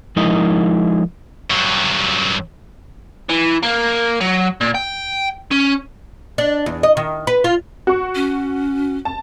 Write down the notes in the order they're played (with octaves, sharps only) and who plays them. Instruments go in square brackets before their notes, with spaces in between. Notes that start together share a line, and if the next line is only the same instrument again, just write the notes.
[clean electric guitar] F3 G#3 D#4 E4 A#4 D#5
[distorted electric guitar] G2 F#3
[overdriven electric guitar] E3
A#3
F#3
A#2
G5
C#4
[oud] D4
E2
D#5
D#3
B4
F4
[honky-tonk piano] F#4 C#6
[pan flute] C#4
[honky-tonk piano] A5